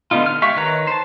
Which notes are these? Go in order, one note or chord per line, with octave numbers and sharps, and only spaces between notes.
D3 B3 D#4 F4
F6
G#3 G4 E5 F5 C#6
D#3 B4 C#5 A#5
C5 A5